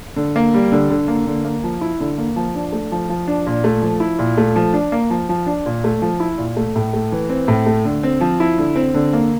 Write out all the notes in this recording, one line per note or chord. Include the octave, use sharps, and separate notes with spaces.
D3
A#3
G3
D3
D3
A#3
D3
A#3
F3
E4
D3
A#3
F3
D4
A3
F3
F3
D4
A#2
A3
F3
E4
A#2
A3
F3
D4
A#3
F3
F3
D4
A#2
A3
F3
E4
A#2
A3
A2
A3
E3
C4
A2
A3
D3
C4
F3
E4
D3
C4
D3
A#3